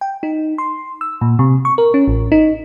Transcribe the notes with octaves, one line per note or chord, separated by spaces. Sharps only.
G5
D#4
C6
E6
A#2
C3
C#6
A#4
C#4
A1
D#4